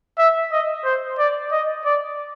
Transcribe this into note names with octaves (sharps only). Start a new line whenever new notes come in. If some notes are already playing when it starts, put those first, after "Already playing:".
E5
D#5
C5
D5
D#5
D5